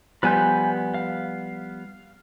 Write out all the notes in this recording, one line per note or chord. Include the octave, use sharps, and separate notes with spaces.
F3 G3 B3 B4 G#5 G6
F5